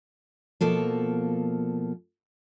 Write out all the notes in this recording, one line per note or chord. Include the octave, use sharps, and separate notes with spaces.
B2 F3 A#3 A4